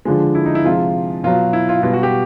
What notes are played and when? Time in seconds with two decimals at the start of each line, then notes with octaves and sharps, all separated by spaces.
0.05 D3 F3 G#3
0.35 E4
0.46 D#4
0.55 E4
0.64 C3 F3 G#3 F4
1.24 B2 F#3 F4
1.53 E4
1.69 F4
1.82 B2 G3 F4
1.93 F#4
2.03 G4